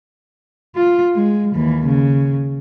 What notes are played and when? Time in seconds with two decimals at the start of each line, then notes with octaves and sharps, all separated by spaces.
0.76 F4
1.15 G#3
1.55 D#2 E3
1.85 C#3